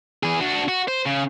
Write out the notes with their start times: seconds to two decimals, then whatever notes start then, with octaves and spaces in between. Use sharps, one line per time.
0.23 E3 G#4
0.41 D4 F#4
0.68 F#4
0.88 C5
1.06 C#3